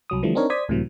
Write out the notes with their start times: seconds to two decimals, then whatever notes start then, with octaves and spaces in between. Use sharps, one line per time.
0.10 C2 F#3 D#6
0.23 D3 E3 F3 G3 A3
0.35 C4 D4 D#4 A#4 C#5
0.50 C5 D5 D#6 G#6 B6
0.68 C#2 A2 C3 E3 F#3